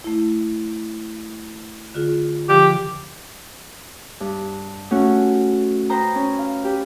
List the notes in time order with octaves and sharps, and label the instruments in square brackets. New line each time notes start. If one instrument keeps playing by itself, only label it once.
[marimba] A3 E4
D3 F4 G#4
[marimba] D3 F3 [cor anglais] G4
[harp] G2
A3 C#4 F#4
B4 C5 G5 A#5 D#6 G6
C#4
F5
G4 B4